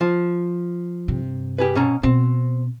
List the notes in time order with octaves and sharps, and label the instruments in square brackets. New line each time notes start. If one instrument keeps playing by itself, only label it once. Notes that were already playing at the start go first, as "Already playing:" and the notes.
[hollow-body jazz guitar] F3
[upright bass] G2 C3
[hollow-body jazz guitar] G4 G#4 B4
B2 C#4 A#5
[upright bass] B2 [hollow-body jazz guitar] C4